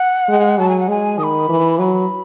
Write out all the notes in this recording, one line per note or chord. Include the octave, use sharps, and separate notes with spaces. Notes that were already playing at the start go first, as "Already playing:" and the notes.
Already playing: F#5
G#3
F#3 A5
G#5
F#5
G#3 G#5
D#3 B5 D#6
E3
F#3 B5